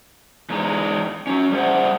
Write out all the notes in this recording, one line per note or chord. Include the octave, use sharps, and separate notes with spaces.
E2 G#3 D#4
C#4 F#4
G3 G#4 C5 E5 F#5